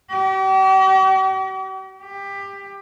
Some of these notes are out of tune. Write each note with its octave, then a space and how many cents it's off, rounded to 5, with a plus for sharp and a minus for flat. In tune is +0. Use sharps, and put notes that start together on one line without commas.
G4 -45
G4 +20